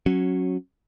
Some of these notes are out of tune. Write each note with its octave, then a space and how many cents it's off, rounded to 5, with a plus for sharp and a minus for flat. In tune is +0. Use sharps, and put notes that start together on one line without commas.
F#3 -5 C#4 -15